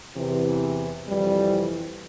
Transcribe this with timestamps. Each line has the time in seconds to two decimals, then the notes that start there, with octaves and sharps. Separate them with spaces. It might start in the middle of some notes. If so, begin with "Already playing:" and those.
0.17 E2 C3 E3
1.07 F2 C3 E3 G3